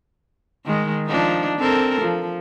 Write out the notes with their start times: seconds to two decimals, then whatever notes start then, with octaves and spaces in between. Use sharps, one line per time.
0.66 D#3 G#3
1.07 F3 D4 D#4
1.58 C4 A4 A#4
2.01 F3